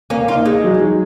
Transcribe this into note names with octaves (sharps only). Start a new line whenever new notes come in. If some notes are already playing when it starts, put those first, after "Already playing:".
A#3 C#4
D#4 F4
G#3 D#4
F#3
F#3